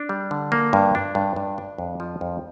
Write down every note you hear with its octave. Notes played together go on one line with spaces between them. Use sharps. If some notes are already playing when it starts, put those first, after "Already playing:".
Already playing: D4
G3
D3
A#3
G2
D4
G2
G2
D4
F2
F3
F2